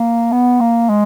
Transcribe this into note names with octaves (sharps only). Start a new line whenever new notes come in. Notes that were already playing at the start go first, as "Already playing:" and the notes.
Already playing: A#3
B3
A#3
G#3